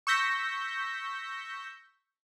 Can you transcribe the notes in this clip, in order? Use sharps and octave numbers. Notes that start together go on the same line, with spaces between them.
C#6 E6 G6 A#6 B6